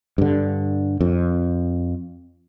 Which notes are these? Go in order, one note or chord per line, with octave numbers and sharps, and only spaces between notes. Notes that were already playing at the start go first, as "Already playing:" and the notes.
G2 D3
F2